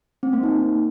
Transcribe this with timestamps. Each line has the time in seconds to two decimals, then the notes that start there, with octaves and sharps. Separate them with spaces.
0.23 C4
0.33 A#3
0.43 D#4